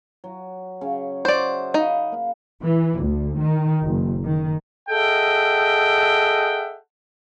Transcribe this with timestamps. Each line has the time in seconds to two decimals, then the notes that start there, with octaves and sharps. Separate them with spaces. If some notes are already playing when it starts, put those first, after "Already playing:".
0.24 F#3
0.81 C#3
1.25 F#4 C5 D5 E5
1.74 D#4 F5 B5
2.12 A#3
2.62 E3
2.99 D2
3.39 D#3
3.83 F#1
4.24 D#3
4.89 G#4 A4 D#5 E5 F#5 G5